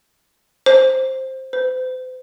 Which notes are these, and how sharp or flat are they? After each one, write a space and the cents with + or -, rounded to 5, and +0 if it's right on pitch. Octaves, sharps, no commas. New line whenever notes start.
C5 +5
C5 -40